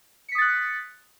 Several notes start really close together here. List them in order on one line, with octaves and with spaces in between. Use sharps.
C#7 B6 D#6 A6 F#6